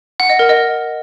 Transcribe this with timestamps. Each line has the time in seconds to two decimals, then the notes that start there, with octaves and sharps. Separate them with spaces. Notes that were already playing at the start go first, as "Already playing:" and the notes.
0.20 F#5
0.29 D#5
0.39 A#4
0.49 D#5